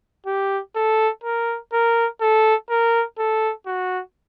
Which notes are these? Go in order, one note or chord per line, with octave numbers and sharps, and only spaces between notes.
G4
A4
A#4
A#4
A4
A#4
A4
F#4